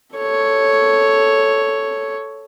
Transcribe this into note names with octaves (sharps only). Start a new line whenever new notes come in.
A4 C#5